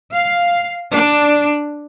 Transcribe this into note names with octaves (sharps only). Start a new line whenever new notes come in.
F5
D4